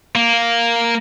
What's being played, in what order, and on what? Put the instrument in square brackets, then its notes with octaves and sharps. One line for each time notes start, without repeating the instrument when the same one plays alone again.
[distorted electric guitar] A#3